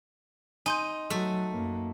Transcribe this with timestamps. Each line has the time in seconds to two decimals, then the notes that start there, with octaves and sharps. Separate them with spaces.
0.66 D#4 G#5 C6 G6
1.10 F#3 A3
1.52 F#2 A#3